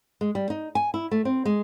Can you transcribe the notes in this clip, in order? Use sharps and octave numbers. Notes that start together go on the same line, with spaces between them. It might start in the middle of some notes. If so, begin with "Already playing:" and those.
G#3
G3
D#4
G#5
E4
A3
C4
G#3